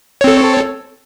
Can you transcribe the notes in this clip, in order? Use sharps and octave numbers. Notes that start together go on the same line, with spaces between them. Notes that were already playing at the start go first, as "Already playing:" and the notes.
C4 A4 C#5